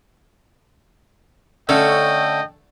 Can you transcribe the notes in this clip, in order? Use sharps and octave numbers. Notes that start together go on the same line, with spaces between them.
D3 A3 C#4 A4 C#5 D#5 G5